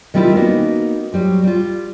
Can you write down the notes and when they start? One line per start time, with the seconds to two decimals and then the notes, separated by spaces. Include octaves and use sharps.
0.14 D#3 G3 C4 E4 F4
0.35 A#3 B3 C#4 D#4 F#4
1.13 F#3 G3 C5
1.44 G3 F4